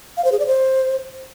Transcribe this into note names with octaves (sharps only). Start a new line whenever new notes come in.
F5
C5
G#4
D5
C5